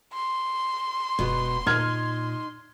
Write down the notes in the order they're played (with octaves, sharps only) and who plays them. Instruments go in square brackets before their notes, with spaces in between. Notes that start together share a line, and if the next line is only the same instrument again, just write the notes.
[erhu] C6
[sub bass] E1 [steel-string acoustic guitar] B2 B3
[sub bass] A#2 [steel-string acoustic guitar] D#4 [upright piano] F6 G#6